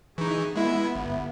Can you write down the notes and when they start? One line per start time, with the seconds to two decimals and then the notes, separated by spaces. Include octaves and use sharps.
0.18 E3 D#4 G#4 C#6
0.56 G#3 B3 E4 E5
0.95 G1